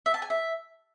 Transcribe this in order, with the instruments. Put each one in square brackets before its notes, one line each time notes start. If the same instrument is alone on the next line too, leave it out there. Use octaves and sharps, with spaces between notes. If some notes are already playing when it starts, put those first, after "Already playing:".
[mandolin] E5
A5
G#5
E5